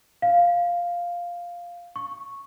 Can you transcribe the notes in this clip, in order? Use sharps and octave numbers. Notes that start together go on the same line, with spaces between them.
F5
C#6